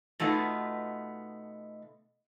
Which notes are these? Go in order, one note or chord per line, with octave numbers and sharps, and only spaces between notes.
B2 A3 B3 D#4 F4